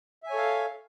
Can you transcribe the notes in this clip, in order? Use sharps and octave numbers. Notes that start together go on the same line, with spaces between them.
A4 C#5 E5 F5 G#5